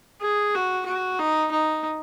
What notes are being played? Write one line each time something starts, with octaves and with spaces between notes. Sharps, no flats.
G#4
F#4
F#4
D#4
D#4